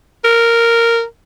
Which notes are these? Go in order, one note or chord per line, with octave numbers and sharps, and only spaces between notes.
A#4